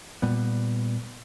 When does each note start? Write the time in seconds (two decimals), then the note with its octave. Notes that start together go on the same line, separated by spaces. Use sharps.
0.22 A#2 G3 B3